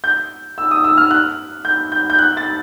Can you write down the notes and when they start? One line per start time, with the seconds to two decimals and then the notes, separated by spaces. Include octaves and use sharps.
0.04 G6
0.58 E6
0.71 D#6
0.84 E6
0.97 F6
1.11 F#6
1.65 G6
1.92 G6
2.10 G6
2.19 F#6
2.37 A6